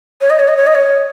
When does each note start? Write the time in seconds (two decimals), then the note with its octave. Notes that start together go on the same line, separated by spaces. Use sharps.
0.21 C#5
0.30 D#5
0.39 C#5
0.48 D#5
0.57 C#5
0.67 D#5
0.75 C#5